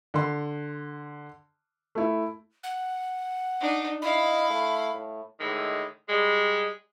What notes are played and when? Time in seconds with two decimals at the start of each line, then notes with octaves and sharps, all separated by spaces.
0.14 D3 C6
1.95 A3 E4
2.64 F#5
3.60 D4 D#4
4.02 E4 D#5 F5 B5
4.50 A3
4.94 A2
5.40 A2 D3 D#3 G#3
6.09 G3 G#3